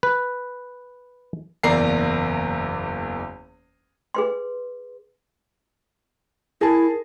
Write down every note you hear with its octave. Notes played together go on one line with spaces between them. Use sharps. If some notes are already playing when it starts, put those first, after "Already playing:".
B4
F#1 E2 A#3 D5 A#5 C7
G#4 B4 C6
E4 G#4 A#4 A5